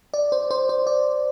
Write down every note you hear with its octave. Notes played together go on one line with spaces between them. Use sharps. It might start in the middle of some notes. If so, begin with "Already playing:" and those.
D5
C5
C5
C5
D5